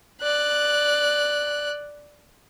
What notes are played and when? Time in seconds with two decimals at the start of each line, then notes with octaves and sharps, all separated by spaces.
0.22 D5 F#6